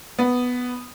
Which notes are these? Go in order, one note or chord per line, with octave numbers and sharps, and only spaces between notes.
B3